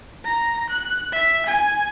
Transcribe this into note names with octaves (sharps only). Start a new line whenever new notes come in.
A#5
F#6
E5
G#5